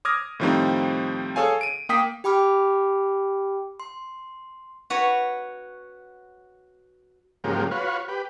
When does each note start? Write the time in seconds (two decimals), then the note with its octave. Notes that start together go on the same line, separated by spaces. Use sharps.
0.05 D6 D#6 F6 G#6 A#6
0.40 A2 D#3 F3 G3 C4 D#4
1.36 G#4 A4 C#5 F5 G#5
1.61 D7 D#7
1.89 A#3 G5 D#6 B6
2.24 G4 G5 B5 D6 F6
3.80 C6
4.90 F#4 B4 C#5
7.44 G#2 C#3 F3 F#3 A#3 G4
7.71 F4 F#4 B4 C#5
8.08 G4 B4